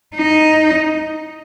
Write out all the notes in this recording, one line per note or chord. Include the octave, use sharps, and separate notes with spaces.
D#4